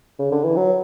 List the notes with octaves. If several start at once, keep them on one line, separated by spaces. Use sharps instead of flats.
C#3
D3
E3
F#3